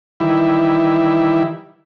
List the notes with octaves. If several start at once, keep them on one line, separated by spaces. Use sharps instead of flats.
D#3 E3 G3 E4